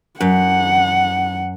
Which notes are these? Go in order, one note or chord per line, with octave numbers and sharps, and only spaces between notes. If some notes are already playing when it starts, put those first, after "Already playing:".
F#2 F#5